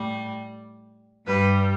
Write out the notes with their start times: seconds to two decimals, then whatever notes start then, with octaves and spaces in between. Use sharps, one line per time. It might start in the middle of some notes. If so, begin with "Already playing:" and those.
Already playing: A2 G3
1.26 G2 G3 B4